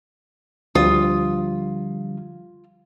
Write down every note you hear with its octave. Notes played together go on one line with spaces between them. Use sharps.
D2 D3 F3 G3 F4 D#6